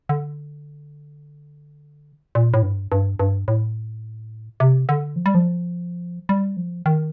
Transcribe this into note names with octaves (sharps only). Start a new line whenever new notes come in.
D3
A#2
A2
G2
G2
G2
A2
C3
D3
F3
G3
F3
G3
F3
D#3